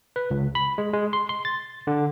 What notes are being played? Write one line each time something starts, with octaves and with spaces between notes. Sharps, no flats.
B4
C#2
B5
G#3
G#3
C6
C6
A6
D3